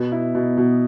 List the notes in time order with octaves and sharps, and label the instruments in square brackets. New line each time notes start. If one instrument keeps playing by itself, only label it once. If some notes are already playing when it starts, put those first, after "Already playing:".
Already playing: [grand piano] B2 [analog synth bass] B3
[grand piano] E4
B2
B2